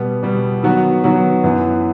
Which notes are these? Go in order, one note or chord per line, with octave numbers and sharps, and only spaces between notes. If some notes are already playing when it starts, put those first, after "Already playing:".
Already playing: B2 G3 B3
B2 G3 B3
D#3 F#3 B3 F#4 B4
D#3 F#3 B3 F#4 B4
F#2 E3 B3